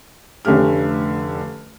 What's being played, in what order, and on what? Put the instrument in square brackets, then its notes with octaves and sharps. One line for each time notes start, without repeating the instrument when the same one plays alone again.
[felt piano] F1 D3 A3 C#4 G4 F6